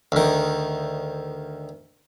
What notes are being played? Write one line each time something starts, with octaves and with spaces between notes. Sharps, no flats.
D2 D#3